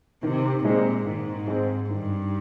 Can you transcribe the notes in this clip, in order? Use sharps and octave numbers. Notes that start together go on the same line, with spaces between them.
C3 D#3
A#2 G#3 C4
G#2 D#3
G#3 C4
G2 D#3